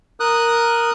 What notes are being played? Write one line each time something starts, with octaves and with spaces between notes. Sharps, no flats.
A#4 D#6 F#6